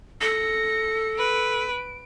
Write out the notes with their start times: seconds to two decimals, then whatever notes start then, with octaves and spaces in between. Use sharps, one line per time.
0.21 A4 A#6 C#7
1.19 B4 D7